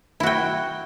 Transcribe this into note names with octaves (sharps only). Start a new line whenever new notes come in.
E4 F#4 G5